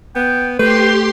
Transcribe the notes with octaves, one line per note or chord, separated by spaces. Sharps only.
B3 G5
A3 G4 B4 C5 C6